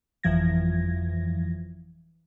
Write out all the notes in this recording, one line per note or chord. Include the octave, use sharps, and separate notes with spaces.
G1 F2 E3 F3 G#6 A#6